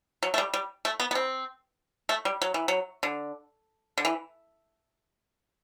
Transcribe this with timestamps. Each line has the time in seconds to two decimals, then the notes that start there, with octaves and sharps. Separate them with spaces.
0.23 F#3
0.34 A3
0.38 G3
0.54 G3
0.85 A3
1.00 B3
1.11 B3
1.15 C4
2.09 A3
2.25 G3
2.42 F#3
2.54 E3
2.68 F#3
3.03 D3
3.98 D3
4.05 E3